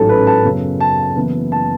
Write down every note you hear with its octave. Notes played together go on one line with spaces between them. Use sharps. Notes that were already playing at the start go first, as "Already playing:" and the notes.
Already playing: A1 G#2 F#3 C#4 A4
B4
A5
F#2 C#3 F#3 B3
A5
F#1 F#2 E3 B3
A5